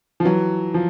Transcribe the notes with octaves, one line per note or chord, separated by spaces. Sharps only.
F3
E3 F#3
F3